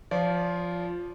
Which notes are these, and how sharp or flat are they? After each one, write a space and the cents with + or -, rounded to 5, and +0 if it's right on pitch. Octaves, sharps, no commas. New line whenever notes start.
F3 +0 F4 +0 D5 -35